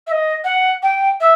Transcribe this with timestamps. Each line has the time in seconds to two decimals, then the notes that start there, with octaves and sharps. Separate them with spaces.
0.07 E5
0.12 D#5
0.44 F#5
0.83 G5
1.21 E5